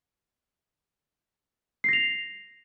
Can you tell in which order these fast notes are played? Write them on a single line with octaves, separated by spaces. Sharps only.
C7 A#6 F7